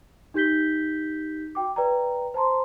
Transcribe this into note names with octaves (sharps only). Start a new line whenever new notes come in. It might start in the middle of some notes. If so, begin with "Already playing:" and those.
D#4 G4 G6 B6 G7
F#4 G5 D6
B4 D5 G5 A#5
C5 A5 A#5 C6